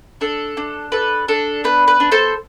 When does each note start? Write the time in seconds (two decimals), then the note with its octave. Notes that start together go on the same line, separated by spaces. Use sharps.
0.21 D4 A4
0.57 D4
0.92 A4 B4
1.28 D4 A4
1.64 B3 B4
1.88 B4
2.00 D4
2.12 A4 C5